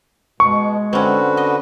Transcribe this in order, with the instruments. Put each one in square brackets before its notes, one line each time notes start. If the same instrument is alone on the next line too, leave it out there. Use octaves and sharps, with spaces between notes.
[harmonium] B2 [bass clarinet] G#3 [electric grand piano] C#6
[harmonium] D3 F#4 B4 [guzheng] C4 C#4
[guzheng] D#5